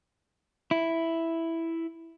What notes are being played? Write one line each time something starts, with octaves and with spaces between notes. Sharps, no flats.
E4